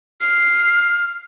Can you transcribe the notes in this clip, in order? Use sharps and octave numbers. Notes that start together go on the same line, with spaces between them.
F6 C7